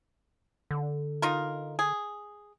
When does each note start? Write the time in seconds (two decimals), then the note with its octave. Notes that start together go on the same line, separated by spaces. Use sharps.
0.71 D3
1.22 D#4 F4 A#4
1.79 G#4